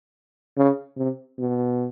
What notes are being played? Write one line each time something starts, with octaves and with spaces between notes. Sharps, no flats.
C#3
C3
B2